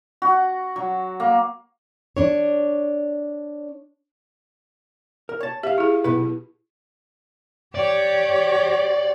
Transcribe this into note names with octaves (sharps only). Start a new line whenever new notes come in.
F#4
F#3
A#3
D4 C#5
A#4
C#5 A5
G4 E5 F5
E4 G#4
B1 B2 E4 B4
G4 C#5 D5